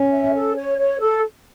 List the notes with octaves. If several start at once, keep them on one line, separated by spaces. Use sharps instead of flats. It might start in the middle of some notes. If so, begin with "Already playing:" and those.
Already playing: C#4
E5
A4
C#5
C#5
A4